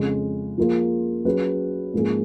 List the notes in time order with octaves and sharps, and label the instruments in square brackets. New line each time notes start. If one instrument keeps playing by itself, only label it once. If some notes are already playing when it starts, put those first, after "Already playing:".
Already playing: [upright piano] F2 C#3 G#3
F3 A#3 F4 G#4
F#3 C#4 G#4 B4
G#2 F3 A#3 C#4 G#4